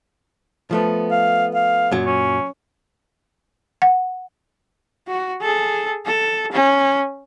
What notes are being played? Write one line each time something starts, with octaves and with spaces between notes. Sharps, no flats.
F3 A3 B3
F5
F5
F#2 A#2 F#3
C#4
F#5
F#4
G#4 A4
A4
C#4